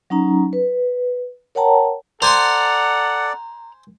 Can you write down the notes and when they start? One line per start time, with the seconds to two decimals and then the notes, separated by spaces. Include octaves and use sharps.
0.10 F#3 C#4 D#4 A#5
0.53 B4
1.55 A#4 C#5 F#5 G5 A5 A#5
2.22 A4 C5 D5 F#5 G#5 A#5 C6